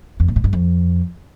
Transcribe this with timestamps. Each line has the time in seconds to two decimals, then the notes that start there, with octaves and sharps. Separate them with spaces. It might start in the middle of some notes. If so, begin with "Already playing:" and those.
0.20 F2
0.28 A#2
0.36 A2
0.44 G2
0.53 F2